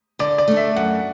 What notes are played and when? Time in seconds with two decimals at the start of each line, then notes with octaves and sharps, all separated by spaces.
0.19 D3 D5
0.38 D5
0.48 A3 D4
0.57 E5
0.76 F#2 F#5